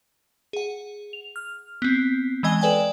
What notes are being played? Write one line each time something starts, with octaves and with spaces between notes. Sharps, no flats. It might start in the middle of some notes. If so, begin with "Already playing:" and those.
G#4 F#5
F7
F6
B3 C4
E3 G#3 D#5 G#5 G7
A4 B4 D5 G5 G#5